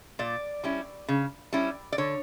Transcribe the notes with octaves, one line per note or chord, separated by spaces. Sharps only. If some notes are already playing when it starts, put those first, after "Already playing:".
A#2 D5
G3 C#4 E4
C#3
G3 C#4 E4
D5
D3 C#5